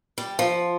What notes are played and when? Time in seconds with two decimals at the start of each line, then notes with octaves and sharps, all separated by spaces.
0.18 G3
0.39 F3